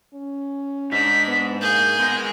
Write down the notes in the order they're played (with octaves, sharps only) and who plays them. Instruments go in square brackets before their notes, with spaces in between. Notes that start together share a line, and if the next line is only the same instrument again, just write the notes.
[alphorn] C#4
[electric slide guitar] G#2 D#4 [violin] D4 [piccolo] B6
[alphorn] B3
[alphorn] A#3 [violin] G#4 [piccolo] G6
[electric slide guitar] G#3 A#4 [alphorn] B3